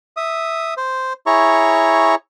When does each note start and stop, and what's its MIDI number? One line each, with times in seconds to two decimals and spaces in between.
0.17 0.74 76
0.17 0.74 87
0.77 1.13 72
1.27 2.15 64
1.27 2.15 68
1.27 2.15 73
1.27 2.15 82
1.27 2.15 85